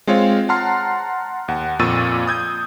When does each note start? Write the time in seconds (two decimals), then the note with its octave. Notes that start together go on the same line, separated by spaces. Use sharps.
0.07 G#3 C4 F4 C#5 F5
0.49 F#5 A5 A#5 C6 F6 C7
1.48 D#2 F#5
1.79 F2 A#2 C#6 E6 A6 D#7
2.27 D#6 G6 G#6